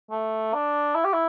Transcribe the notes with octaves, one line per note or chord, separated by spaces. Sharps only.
A3
D4
E4
G4
E4